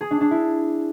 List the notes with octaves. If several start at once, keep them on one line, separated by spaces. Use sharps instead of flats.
G#4
D4
D4
E4